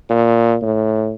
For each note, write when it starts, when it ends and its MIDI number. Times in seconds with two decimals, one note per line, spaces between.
0.10 0.56 46
0.62 1.15 45